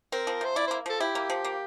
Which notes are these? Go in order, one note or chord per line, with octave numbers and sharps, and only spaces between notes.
C4 A#4
F3
C3 C5
E4 D5
A#3 C5
F3 A4
E4 G4
A#3
F3
A#3